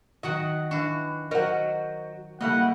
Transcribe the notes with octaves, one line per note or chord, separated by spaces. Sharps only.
D#3 F#3 F#4 D#5 F#5
E3 D4 F#4
F#3 F#4 A#4 C5 D#5 F#5
C#3 G3 A3 A#3 E4 D#5 F#5